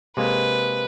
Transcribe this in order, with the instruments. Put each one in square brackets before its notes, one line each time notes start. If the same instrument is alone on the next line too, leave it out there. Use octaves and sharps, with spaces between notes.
[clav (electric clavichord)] C3 G#3 A#3 [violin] B4